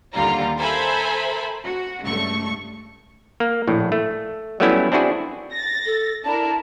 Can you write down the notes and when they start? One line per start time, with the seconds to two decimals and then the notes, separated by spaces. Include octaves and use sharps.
0.14 D#2 D3 G3 F4 A#5
0.57 A4 A#4 C5 E5 G#5 B5
1.64 F#4
2.05 C#2 G2 A3 C#6
3.40 A#3
3.67 A#1 A2
3.92 A3
4.60 F#3 G3 A3 B3 C#4 E4
4.92 C4 D4 E4 F#4 G#4
5.52 A6 A#6
5.86 A4
6.25 D4 E4 A#4 A5